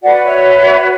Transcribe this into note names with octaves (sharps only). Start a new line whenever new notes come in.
F#4 B4 D5 F#5
C#5 E5